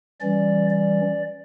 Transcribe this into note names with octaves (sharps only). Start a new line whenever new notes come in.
E3 G3 C#4 D5
D5